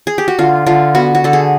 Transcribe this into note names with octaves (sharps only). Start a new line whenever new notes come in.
G#4
G4
F#4
D3 F4
D3 F4
B3 F#4
F#4
D3 A4
G#4